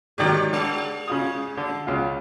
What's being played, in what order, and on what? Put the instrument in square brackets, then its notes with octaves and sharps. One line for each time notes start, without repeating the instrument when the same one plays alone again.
[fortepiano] G#2 D#3 F#3 [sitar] G4 D5
[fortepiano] D3 [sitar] G#3
[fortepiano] C#3 F4 D#6
D3
C#2 F4